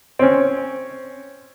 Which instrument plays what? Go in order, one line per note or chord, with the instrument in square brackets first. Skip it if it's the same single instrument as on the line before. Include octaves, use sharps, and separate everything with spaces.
[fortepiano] C4 C#4